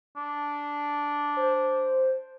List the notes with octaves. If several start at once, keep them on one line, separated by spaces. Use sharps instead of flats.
D4
C5